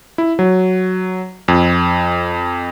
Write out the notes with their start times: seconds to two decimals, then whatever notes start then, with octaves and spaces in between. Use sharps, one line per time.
0.18 E4
0.39 F#3
1.48 F2